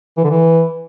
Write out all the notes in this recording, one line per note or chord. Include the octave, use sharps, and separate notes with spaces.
E3
D3
E3